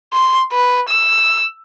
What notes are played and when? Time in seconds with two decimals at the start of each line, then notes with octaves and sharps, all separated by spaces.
0.14 C6
0.52 B4
0.89 E6